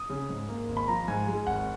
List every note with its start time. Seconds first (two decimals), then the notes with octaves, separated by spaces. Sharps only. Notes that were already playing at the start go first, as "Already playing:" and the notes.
Already playing: D#6
0.10 C#3
0.29 G#2
0.49 A#3
0.68 G#1
0.77 B5
0.88 F3 A#5
1.08 G#2 G#5
1.28 G#3
1.47 G#1 F#5